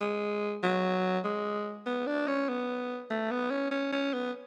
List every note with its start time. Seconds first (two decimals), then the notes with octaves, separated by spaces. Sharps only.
0.01 G#3
0.63 F#3
1.24 G#3
1.86 B3
2.07 D4
2.27 C#4
2.49 B3
3.10 A3
3.31 B3
3.51 C#4
3.71 C#4
3.92 C#4
4.13 B3